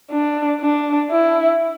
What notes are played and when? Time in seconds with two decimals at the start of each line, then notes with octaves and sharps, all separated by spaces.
0.11 D4
0.61 D4
1.10 E4